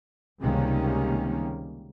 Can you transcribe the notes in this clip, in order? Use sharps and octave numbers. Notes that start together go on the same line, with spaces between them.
C#2 C3 D#3 G3 A#3 C#4